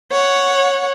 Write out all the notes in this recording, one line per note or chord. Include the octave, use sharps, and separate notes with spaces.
C#5 F#5